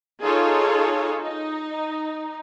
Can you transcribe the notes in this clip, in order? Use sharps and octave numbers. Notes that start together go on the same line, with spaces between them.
D#4 F4 G#4 A4 C#5
D#4